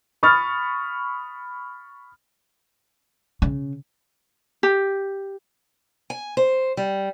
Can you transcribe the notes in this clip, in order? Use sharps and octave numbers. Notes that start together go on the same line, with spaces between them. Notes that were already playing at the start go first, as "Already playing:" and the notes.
B5 C#6 D#6 F6 A6
C#3
G4
G#5
C5
G3